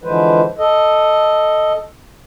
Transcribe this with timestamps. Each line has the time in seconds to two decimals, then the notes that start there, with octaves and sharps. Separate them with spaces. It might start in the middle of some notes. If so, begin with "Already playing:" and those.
0.04 D3 E3 F3 G#3 B4 C5
0.58 A4 D#5